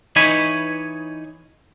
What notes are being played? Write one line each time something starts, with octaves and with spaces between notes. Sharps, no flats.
E3 D#4 C#5 G#5 B5